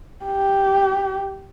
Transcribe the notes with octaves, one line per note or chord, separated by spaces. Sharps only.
G4